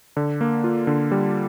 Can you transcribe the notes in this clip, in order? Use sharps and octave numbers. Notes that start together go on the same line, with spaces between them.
D3
A#3
F4
D3
G3